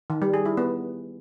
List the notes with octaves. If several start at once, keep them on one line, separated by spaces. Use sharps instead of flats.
D#3
G3
G#4
E4
B3